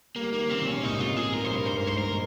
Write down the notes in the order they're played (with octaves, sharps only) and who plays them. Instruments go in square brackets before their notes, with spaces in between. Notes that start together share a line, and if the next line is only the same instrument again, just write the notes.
[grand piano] G3 [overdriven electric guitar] A#3
[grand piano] D#3 [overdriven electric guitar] A#3
[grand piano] C#3 [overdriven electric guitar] C4
[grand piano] A#2
[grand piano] C3 [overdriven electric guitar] C#4
[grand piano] G#2 [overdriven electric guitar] D#4
[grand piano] C3
[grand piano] A#2 [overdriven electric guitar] F4
[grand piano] C3 [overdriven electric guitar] G#4
[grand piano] G#2
[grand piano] A#2 [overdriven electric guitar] A#4
[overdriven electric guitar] C5
[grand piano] G2 [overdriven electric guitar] A#4
[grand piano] G#2 [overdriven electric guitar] C5
[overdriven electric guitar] A#4
[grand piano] G#2
[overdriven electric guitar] C5
[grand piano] G#2
[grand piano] A#2 [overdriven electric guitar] A#4